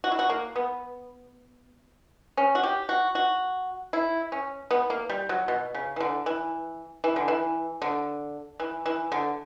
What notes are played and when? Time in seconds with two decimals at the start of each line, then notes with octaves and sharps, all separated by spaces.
0.04 F#4
0.11 E4
0.19 F#4
0.29 A#3
0.56 B3
2.37 C#4
2.55 F#4
2.63 G4
2.89 F#4
3.15 F#4
3.93 E4
4.32 C#4
4.71 B3
4.90 A#3
5.10 G3
5.29 F#3
5.48 B2
5.75 C#3
5.96 E3
6.00 D3
6.26 E3
7.04 E3
7.16 D3
7.28 E3
7.82 D3
8.60 E3
8.86 E3
9.12 D3